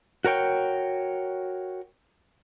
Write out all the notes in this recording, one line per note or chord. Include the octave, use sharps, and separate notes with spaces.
F#4 A#4 C#5 G5